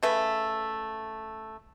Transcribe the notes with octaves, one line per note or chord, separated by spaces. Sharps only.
C#3 A3 B4